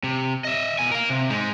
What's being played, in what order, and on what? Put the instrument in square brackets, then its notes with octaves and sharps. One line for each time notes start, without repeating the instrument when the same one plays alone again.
[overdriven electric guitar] C3
D#5 E5
B2 G#5
A#4 F5
C3
G#3 D#4